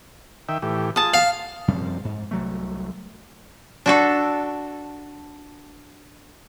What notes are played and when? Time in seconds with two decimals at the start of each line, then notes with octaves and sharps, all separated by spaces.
0.49 D#3 E5 G5
0.62 A2 E3 G4
0.96 F4 G#4 A5 D#6
1.14 F5
1.68 F#2 C3 F3 G3
2.05 G#2
2.31 C2 F#3 A3
3.86 D4 F#4 A4